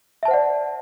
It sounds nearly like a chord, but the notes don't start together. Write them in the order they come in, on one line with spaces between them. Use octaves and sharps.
E5 A5 C5 F#5 D5